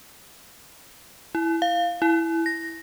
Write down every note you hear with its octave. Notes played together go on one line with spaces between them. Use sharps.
E4
F5
E4
A#6